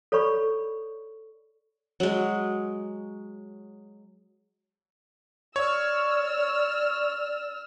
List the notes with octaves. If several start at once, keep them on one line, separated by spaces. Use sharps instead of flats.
A4 C#5 D5 B5 C#6
F#3 G#3
C#5 D5 E6 F6